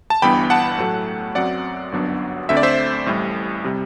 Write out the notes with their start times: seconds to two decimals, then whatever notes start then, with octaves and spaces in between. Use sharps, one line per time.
0.10 A5
0.22 G1 G2 E3 B3 G5 B5
0.50 F#5 A5
0.79 A2 F#3 A3
1.35 F#2 F#3 C4 D5 F#5
1.92 G1 F#2 F#3 B3 D4
2.49 D2 D3 A3 C4 E5
2.57 D5
2.63 C5 E5
3.06 A1 A2 G3
3.64 C3 G3